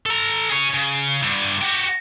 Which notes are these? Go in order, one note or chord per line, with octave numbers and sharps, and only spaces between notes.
A4 A#5
G#4 C#5
C#3
G2 D3
F#4 G4